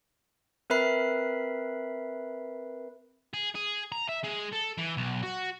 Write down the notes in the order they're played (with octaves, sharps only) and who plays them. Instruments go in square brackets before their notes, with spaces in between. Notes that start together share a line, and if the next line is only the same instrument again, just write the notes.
[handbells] C4 A#4 B4 E5 B5 C7
[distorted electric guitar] G#4
G#4
A#5
E5
G#3
A4
E3
B1
F#4